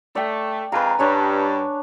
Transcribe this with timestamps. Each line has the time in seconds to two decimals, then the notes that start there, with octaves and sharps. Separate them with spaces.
0.15 A3 D5 G5
0.72 F2 G#3 F4 B4 G#5 A#5
0.99 G2 D4 C#5 D5